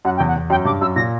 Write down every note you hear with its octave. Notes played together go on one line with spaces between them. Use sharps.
F#2 F#5
G5
E2
F#5
E2
F#2 G5
G2 D6
F#2 E6
A#2 A#6